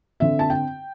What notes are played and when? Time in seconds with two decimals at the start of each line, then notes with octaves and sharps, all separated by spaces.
0.20 D3 C4 E5
0.39 A5
0.50 G5